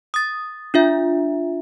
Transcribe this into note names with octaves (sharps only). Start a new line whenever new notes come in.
D#6 A6
D4 F4 E5